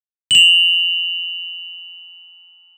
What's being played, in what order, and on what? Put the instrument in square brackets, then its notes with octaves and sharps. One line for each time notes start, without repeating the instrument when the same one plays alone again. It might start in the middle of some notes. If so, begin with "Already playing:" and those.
[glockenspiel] F7 F#7